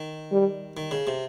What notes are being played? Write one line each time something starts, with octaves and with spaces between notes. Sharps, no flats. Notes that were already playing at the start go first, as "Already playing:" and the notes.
Already playing: D#3
G3
D#3
C#3
C3